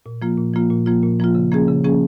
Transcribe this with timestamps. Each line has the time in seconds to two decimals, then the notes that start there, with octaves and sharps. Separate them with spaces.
0.06 A#2
0.22 F3 A#3 F4
0.38 A#2
0.54 F3 A#3 F4
0.70 A#2
0.86 F3 A#3 F4
1.03 A#2
1.20 F3 A#3 F4
1.35 C#3
1.52 F3 A#3 C#4 G#4
1.68 C#3
1.84 F3 A#3 C#4 G#4